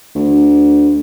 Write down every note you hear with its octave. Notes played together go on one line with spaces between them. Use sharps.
D2